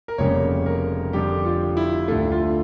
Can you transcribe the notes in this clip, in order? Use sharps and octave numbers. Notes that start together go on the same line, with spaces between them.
A#4
F1 F2 C#3 G3 A#3 C#5
A#4
F2 D3 G3 G4
F4
E4
D2 D3 A3 F4
F4